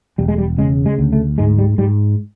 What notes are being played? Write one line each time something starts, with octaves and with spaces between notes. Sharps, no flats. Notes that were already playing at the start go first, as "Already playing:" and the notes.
E1 G3
G#3
G3
C#3 G#3
G#3
D2
A3
G#2 G#3
G3
G#2 G3